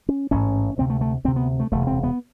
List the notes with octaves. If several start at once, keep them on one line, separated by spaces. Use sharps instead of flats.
C#4
A1 G#2 C#4
D2 C3 C4
A3
A3
D2 C3 C4
B3
A3
E1 D2 C3 A3
C4
B3